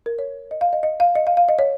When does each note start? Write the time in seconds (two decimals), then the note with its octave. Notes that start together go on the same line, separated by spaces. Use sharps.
0.06 A#4
0.19 C#5
0.51 D#5
0.61 F5
0.73 D#5
0.83 D#5
1.00 F5
1.15 D#5
1.27 F5
1.37 F5
1.49 D#5
1.59 C#5